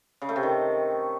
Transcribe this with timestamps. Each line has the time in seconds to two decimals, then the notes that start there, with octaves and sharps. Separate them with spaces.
0.22 C#3
0.29 A3
0.36 C3
0.43 D#3